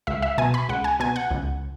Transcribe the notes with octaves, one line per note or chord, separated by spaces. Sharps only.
C#2 E5
E5
B2 G#5
B5
C#2 F#5
G#5
B2 G#5
F#5
C#2